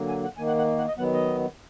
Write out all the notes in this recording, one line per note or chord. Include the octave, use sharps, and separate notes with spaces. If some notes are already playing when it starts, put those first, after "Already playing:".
Already playing: D3 F#3 A#3
G#5
F#5
D#3 A#3 G#5
F#5
F#5
F#5
D#5
D#3 F#3 B3 F#5
D#5